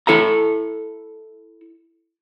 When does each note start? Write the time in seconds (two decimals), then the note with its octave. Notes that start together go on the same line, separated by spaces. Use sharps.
0.07 E4 A4 E5 A#5